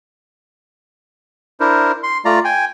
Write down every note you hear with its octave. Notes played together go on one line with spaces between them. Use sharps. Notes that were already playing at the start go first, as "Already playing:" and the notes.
D4 E4 A#4 C5
C6
A3 F4 D5 A#5
G5 G#5